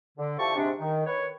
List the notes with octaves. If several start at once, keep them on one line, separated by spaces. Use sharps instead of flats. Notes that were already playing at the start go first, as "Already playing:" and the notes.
D3
D3 F3 E4 G4 A5 C#6
G#2 C3 D4
D#3
B4 C#5